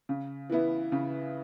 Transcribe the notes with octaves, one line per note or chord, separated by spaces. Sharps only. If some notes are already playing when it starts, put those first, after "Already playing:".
C#3
E3 B3 E4
C#3